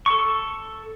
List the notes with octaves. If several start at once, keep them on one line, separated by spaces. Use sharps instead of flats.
A4 C#6